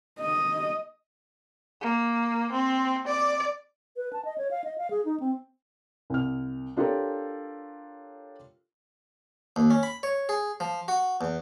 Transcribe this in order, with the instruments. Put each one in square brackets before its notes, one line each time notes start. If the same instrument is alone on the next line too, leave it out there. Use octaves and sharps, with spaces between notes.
[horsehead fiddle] D#5
[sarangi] A#3
C4
D5
[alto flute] B4
A5
D#5
C#5
F5
D#5
F5
G#4
D#4
C4
[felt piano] C2 F6
D4 F4 G4 A4 A#4 C#5
[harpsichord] D#2
C#4
B5
C#5
G#4
F3
F#4
E2